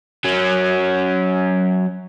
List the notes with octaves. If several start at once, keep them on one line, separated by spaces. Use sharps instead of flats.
F#3 C#4